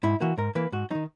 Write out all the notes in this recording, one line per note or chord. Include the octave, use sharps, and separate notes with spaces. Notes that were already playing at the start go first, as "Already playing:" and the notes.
G#2 E4
E3 A#3 F#4
G#2 A#4
E3 A#3 B4
G#2 F#4
D#3 F#3 D#4